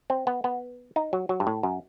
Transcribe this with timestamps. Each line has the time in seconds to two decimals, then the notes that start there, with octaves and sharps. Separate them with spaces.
0.10 C4
0.27 B3
0.44 B3
0.96 D#4
1.13 F#3
1.29 F#3
1.40 G2
1.47 A2
1.63 F#2